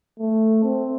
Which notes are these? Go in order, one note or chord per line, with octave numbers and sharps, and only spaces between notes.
A3
C4